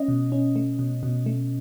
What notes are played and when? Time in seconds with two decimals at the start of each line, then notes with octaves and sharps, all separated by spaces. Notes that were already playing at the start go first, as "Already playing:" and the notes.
Already playing: C#4 D#5
0.08 B2
0.32 C#4
0.56 A3
0.79 B2
1.03 B2
1.26 A3